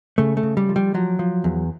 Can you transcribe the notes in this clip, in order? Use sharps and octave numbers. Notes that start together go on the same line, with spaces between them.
C#3 A3
A3
C#3
G3
F3
G3
F3 F#3
F3
E2